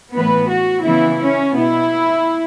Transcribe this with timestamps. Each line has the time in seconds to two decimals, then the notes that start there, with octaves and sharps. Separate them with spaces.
0.13 A2 E3 B3 B4
0.48 F#4
0.83 C#3 E3 B3 E4
1.19 C#4
1.53 B2 B3 E4